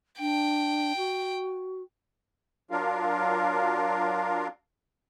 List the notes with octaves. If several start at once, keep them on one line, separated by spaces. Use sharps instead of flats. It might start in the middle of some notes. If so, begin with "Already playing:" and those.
D4 G5
F#4
F#3 D4 F4 A#4 F5